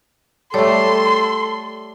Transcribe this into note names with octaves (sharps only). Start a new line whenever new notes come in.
G3 A3 A4 C#5 D5 C6